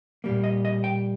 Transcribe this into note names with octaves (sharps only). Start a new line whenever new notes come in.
A#2 G3 A#3
D#5
D#5
G5